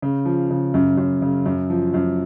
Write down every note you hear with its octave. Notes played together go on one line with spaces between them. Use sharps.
C#3
F3
C#3
F#2
F#2
C#3
F#2
F3
F#2